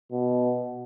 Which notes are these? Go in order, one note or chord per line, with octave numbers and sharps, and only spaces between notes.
B2